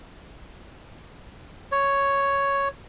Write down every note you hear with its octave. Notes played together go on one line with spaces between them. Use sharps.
C#5